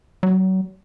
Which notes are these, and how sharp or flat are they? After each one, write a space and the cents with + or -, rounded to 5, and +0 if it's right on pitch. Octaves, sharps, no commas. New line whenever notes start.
F#3 +30